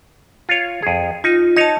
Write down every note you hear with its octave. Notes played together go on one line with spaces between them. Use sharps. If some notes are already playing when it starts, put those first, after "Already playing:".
F4 C#5
F2 G#4
D#4 F4
D#4 C#5 D#5 A5